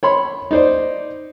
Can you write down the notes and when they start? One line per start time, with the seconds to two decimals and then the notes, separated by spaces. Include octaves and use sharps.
0.03 C#5 B5 C6
0.51 D#4 C5 D5